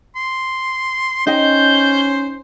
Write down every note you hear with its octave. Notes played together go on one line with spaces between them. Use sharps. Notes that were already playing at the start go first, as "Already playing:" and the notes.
C6
C#4 D#4 C5 D#5 G5 G6